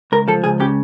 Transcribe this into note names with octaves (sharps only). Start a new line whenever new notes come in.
C#2 A#4
F3 A4
C#2 G#4
C#3 G4